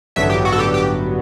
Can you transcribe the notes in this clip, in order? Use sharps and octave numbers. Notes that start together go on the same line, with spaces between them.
A1 G2 D3 F#3 B3 E5
G4
F#4
A4
G4
G4